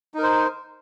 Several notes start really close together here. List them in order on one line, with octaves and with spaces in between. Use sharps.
D#4 A#4 C5